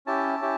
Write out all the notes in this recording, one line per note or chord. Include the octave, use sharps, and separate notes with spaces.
C#4 E4 G4 A5
C#4 E4 G4